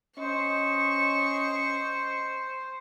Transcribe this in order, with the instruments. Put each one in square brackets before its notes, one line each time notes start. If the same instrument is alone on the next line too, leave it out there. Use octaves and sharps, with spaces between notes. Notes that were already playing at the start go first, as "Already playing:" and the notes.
[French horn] C#4 [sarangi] C5 [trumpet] D#5 [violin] C#6